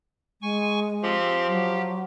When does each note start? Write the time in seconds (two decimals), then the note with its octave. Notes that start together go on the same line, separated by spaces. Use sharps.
0.42 G#3 G#5 C#6
1.03 F3 C4 G4 C6
1.48 F#3 G4